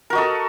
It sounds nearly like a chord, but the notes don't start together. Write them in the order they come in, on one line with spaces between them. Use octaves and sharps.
A#4 F#4 D#5 A4